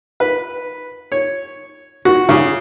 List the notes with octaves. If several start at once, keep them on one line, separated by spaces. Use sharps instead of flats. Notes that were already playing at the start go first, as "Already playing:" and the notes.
B4
C#5
F#4
C#3